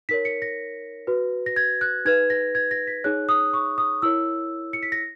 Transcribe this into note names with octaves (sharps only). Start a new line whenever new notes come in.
D#4 A#4 C#5 B6
C#7
A#6
F#4 B4
A#6
G#6
F#6
D#4 G#4 B4 G#6
A#6
G#6
A#6
B6
D#4 G#4 C#5 F#6
D#6
C#6
D#6
E4 A#4 C#5 E6
C#7
B6
A#6